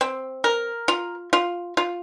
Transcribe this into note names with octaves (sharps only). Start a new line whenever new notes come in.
C4
A#4
F4
F4
F4